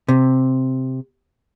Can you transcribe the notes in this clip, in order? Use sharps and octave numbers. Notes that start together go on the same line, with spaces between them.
C3